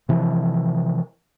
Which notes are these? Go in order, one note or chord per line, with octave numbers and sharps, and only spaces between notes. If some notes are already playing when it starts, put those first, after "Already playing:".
C3 E3 F3